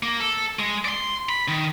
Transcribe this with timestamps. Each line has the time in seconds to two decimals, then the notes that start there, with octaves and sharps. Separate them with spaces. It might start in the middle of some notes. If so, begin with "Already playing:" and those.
0.03 A#3
0.20 A4
0.59 G#3
0.85 D5 C6
1.29 B5
1.48 D#3